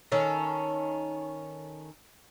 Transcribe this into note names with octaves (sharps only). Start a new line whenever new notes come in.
D#3 C#4 A4